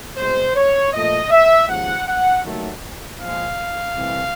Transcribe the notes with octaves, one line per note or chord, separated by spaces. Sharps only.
C2 B2 G#3 C5
C#5
A#2 F3 A3 D#5
E5
D#2 C#3 F3 G#3 F#5
F#5
D#2 D#3 F#3 A3
A#2 F3 G#3 F5
C2 C3 E3 A3